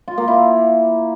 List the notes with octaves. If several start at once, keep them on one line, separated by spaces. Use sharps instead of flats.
F4
A#3
E4